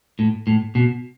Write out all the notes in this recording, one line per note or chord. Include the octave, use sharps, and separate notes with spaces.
A2
A2
B2